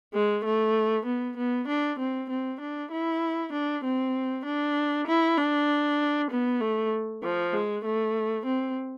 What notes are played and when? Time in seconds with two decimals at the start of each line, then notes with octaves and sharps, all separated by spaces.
0.14 G#3
0.45 A3
1.06 B3
1.37 B3
1.68 D4
1.99 C4
2.30 C4
2.60 D4
2.92 E4
3.53 D4
3.84 C4
4.45 D4
5.07 E4
5.38 D4
6.31 B3
6.61 A3
7.23 F3
7.53 G#3
7.85 A3
8.46 C4